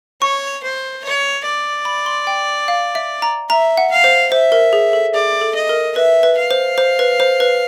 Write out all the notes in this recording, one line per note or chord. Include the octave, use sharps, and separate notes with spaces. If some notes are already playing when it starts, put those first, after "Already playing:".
C#5 C#6
C5
C#5
D5
B5
C6
G5
F5
E5
A#5
E5 A#5
F#5
F5
C5
C5 E5
A#4
G#4
A4
G#4 D5
A4
D#5
A#4
B4 E5
B4
F5
C5
C5
B4
C5
B4